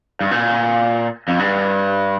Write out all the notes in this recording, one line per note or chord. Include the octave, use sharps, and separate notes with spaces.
G2
A#2
F2
G2